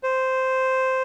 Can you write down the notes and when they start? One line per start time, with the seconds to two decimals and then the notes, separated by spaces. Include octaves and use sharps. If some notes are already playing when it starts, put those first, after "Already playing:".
0.03 C5